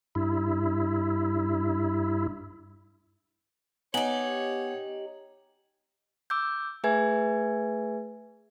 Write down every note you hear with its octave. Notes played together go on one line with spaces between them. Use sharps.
G2 E4
B3 D#4 G4 C#5 F#5 G#5 F#7
D6 E6 G6
A3 G#4 B4 E5 G#5 G#6